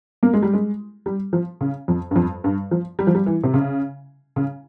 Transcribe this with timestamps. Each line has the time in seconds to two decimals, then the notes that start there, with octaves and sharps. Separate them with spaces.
0.23 A#3
0.34 G#3
0.43 G3
0.53 G#3
1.06 G3
1.33 F3
1.61 C#3
1.88 F2
2.11 G2
2.16 F2
2.44 G2
2.71 F3
2.99 G3
3.07 F3
3.15 G3
3.26 E3
3.44 C3
3.54 C#3
4.36 C#3